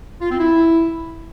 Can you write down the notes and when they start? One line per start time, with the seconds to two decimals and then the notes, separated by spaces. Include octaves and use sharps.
0.21 F4
0.30 C4
0.39 E4